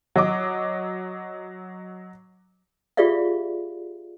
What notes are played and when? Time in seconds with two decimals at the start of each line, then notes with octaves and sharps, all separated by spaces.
0.16 F#3 D#5 D6
2.97 F4 G4 G#4 D5 E5 F5